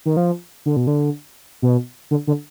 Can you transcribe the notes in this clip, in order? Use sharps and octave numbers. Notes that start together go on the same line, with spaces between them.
D#3
F3
D3
B2
D3
B2
D3
D3